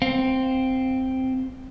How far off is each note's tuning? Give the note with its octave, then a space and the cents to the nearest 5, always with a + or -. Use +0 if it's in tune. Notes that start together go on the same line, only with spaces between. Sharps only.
C4 +0 F5 +20